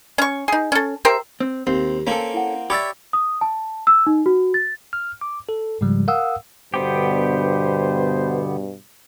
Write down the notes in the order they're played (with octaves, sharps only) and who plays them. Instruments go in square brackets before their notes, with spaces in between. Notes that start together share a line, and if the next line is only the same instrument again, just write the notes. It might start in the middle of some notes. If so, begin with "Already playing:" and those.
[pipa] C#4 C#6
D#4 G#4
C#4 A4
G4 A#4 C5 E5
[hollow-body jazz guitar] C4
[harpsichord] D#2 [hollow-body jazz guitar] C4
[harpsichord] A#3 C4 [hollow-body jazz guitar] C#4 A4
[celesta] E4 F#5
[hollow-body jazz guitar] G4 [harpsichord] C#5 D5 E5 [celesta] B5 E6 A6
[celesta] D#6
A5
E6
D#4
F#4
A6
[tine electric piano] F6
D6
A4
G#2 C#3 F3 G3 G#3
A#4 F5 F#5 D#6 E6
[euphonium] G2 [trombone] B2 [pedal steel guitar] D3 B3 G4 [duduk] C5